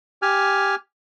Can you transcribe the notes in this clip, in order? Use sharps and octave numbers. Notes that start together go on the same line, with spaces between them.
G4 G#5 F6